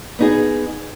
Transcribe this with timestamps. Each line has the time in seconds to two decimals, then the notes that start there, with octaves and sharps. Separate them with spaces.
0.19 B3 D#4 G#4